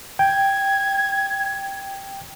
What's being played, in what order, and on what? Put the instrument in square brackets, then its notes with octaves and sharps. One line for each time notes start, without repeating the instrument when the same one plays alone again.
[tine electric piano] G5 [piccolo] G#6